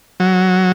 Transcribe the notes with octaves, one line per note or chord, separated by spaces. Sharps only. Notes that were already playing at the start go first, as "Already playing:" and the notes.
F#3